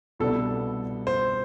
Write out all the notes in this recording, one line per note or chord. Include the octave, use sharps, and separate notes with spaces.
C2 B2 G3 B3 D4 A4
C5